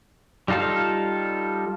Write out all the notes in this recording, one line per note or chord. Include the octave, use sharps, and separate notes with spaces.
G3 D#4 F4 A4 F5